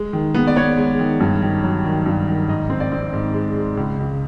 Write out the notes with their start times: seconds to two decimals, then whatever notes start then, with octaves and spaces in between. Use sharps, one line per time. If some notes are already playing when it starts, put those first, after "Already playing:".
Already playing: G#3
0.13 D#3
0.34 B3
0.47 D5
0.56 B3 C#5
0.77 G#3
0.99 D#3
1.20 G2
1.42 D#3
1.63 F#3
1.85 D#3
2.06 G2
2.28 D#3
2.48 G#2 D#5
2.70 C4
2.80 D5
2.92 C4
3.13 G#2
3.34 G#3
3.56 G#3
3.77 C#2
3.99 C#2